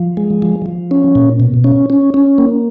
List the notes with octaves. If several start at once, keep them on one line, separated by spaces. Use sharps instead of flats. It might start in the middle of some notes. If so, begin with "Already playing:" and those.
Already playing: F3
G#3
F3
F3
C#4
A#2
B2
C#4
C#4
C#4
A#3